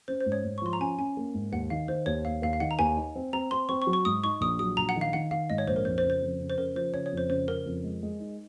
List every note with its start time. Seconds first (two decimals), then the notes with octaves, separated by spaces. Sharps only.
0.08 C#4 C5
0.20 C5
0.26 G#2
0.32 C#5
0.45 G#2
0.58 C#6
0.62 F3 C6
0.73 A#5
0.80 C#4 G#5
0.98 C#4 G#5
1.17 A#3
1.34 G#2
1.52 D#2 F#5
1.70 D#3 F5
1.88 D#3 C5
2.06 D#2 C#5
2.25 D#2 F5
2.42 D#2 F5
2.53 F5
2.60 D#3 F#5
2.71 A#5
2.79 D#2 G#5
2.97 D#4
3.15 C4
3.33 C4 A#5
3.51 C4 C6
3.69 C4 C#6
3.82 C#6
3.87 F#3
3.93 C#6
4.05 G#2 D#6
4.24 D#4 C#6
4.41 A#1 D#6
4.59 F#3 D#6
4.77 A#1 A#5
4.89 F#5
4.96 D#3
5.01 F5
5.13 D#3 F#5
5.31 D#3 F5
5.50 G#2 D#5
5.58 C#5
5.67 A#1 C5
5.76 A#4
5.85 F2 C5
5.98 C5
6.04 C#3
6.10 C5
6.22 F2
6.40 C#3
6.50 C5
6.58 C#3 A#4
6.75 F3 C5
6.94 C#3 C#5
7.06 C#5
7.12 F2
7.18 C5
7.30 C#3 C5
7.48 C#3 A#4
7.66 F2
7.84 G#3
8.03 G#3
8.20 D#4